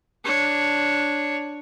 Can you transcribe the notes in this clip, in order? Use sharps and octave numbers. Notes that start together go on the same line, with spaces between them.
D4 C#5